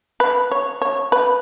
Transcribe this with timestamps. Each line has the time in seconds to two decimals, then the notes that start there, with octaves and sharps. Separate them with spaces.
0.20 B4
0.51 C#5
0.82 C#5
1.12 B4